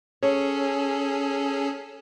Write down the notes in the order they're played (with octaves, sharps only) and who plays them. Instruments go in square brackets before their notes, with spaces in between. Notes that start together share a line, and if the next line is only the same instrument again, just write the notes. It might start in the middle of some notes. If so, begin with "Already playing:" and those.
[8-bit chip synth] C#4 G#4 A4 [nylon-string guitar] C#5